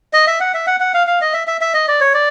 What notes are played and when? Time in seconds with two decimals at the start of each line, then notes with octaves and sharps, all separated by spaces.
0.13 D#5
0.27 E5
0.40 F#5
0.54 E5
0.67 F#5
0.80 F#5
0.94 F5
1.07 F5
1.21 D#5
1.33 E5
1.47 E5
1.61 E5
1.74 D#5
1.88 D5
2.01 C#5
2.14 D5